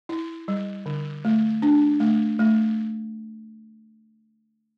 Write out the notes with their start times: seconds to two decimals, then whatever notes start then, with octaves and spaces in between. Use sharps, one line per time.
0.09 E4
0.48 G3
0.86 D3
1.25 A3
1.62 D4
2.00 A3
2.39 A3